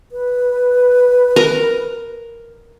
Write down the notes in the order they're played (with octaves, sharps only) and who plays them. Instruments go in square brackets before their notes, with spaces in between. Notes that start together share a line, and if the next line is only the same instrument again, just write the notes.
[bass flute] B4
[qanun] A#4